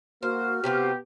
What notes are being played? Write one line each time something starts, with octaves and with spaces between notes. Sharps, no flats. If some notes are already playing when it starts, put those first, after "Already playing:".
A#3 F#4 C5 F6
C3 B3 C4 F4 G4